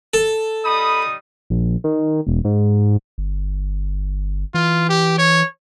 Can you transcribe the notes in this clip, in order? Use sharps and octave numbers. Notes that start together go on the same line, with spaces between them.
A4
G3 D#4 B5 D#6
A#1
D#3
E1
G#2
G1
E3 F4
G4
C#5